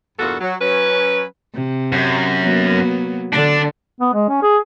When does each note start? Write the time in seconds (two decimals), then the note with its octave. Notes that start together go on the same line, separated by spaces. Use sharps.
0.18 E2 G2 A#2 F4 F#4 A4
0.40 F#3
0.60 F#3 C#4 B4
1.54 C3
1.92 F#2
2.43 F#3 A#3 B3
3.33 D3 D4
4.01 B3
4.13 G#3
4.29 C#4
4.42 G#4